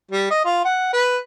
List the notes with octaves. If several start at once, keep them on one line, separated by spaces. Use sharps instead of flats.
G3
D#5
F4
F#5
B4